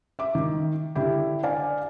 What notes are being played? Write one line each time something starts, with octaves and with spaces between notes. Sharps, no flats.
E5 D6
D#3
D3 E4 G4
D5 F5 G#5